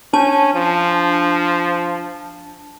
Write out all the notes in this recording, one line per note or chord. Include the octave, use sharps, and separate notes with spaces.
C#4 D4 A5
F3